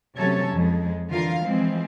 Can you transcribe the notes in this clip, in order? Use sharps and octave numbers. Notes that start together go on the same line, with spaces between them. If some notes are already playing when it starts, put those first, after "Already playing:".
C3 F#3 A3 C#4 A4 C#5
F2 G#3
D3 E3 F4 A#4 F5
E3 F3 G#3 C4